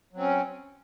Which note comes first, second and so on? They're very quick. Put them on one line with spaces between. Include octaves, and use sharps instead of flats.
F#3 C4 C#4